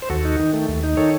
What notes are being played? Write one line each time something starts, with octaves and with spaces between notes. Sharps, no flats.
C5
D#2 F#4 A4
D#4
D#3
A3
D#2
D#4
D#3 A4 C#5